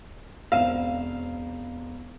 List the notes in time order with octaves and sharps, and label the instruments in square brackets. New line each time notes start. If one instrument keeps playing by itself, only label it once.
[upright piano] E1 C4 E7 [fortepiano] F5